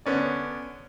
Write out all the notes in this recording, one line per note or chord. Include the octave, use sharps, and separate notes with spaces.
D3 B3 C#4 D5